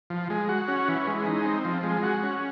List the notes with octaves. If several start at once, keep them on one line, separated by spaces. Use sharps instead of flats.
F3
G#3
F#4
C#4
E3
G#3
D#4
C4
F3
G#3
F#4
C#4